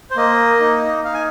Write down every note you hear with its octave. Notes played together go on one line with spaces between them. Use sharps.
C5
A#3 D#5
D#4
D#4 F5
G#5